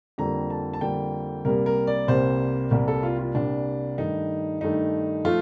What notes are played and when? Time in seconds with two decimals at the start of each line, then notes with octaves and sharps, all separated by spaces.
0.18 F2 D3 G3 A#3 A#5
0.50 A5
0.74 A5
0.81 F2 D3 G3 A#3 G5
1.45 C2 C3 G3 A#3 A#4
1.66 A#4
1.87 D5
2.08 C2 C3 G3 A#3 C5
2.71 C2 C3 G3 A#3 A#4
2.88 A4
3.03 F4
3.19 F4
3.35 C2 C3 G3 A#3 D4
3.98 G2 D#3 A3 D#4
4.61 G2 D#3 A3 D#4
5.25 F3 A3 F4